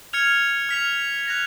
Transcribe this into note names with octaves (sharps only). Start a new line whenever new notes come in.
F6 G#6 C#7 F7
F6 B6 F7
F#6 A#6 F7